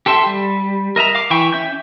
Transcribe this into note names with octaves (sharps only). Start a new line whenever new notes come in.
G4 A4 C5 E5
G3
A#4 D#5 E5 A#5
F5 D6
E3 E4 G5 C#6
C#4 E5 D6 G6